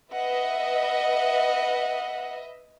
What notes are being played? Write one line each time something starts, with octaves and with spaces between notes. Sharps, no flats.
B4 D#5 E5 F#5